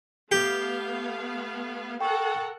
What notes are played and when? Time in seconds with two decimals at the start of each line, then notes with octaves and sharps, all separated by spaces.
0.32 A3 B3 G4 F5
2.01 A4 A#4 F#5 G5 C#6